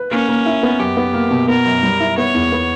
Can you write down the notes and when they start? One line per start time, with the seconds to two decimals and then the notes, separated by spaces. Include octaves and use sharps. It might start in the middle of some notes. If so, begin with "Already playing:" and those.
Already playing: B4
0.11 A#3 C#4
0.29 A#3
0.46 E4
0.63 B3
0.80 F#2 G4
0.97 B3
1.14 A#3
1.31 B2
1.48 B3 A#4
1.66 F#2
1.83 G3
2.00 E4
2.18 B3 C#5
2.34 E2
2.52 B3